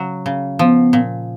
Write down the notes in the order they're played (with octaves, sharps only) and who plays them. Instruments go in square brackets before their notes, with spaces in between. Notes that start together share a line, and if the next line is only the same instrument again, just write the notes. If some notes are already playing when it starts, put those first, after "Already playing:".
Already playing: [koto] C#3 F#3
C#3
[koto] F3 [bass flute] B3
[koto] A#2